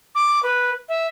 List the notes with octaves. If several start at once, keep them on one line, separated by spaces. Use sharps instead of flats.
D6
B4
E5